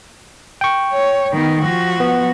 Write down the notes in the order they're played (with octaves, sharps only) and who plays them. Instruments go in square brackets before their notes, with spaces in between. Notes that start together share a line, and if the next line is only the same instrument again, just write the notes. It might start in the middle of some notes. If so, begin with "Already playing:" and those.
[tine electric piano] G5 C#6
[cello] C#5
D#3 B3
F3 F#4
[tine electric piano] B3